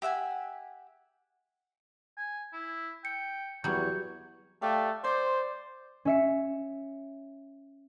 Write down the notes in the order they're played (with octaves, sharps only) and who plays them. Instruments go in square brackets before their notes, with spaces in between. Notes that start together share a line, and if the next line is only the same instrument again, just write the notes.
[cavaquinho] G4 E5 F#5 G#5
[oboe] G#5
E4
[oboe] G5 [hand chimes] C#7
[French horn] E2 [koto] F#3 G3 [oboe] C#5 [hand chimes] G6
[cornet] A3 [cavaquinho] G4 D5 F5
[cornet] C5 [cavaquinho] D5 C6
[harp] C#4 E5 C#7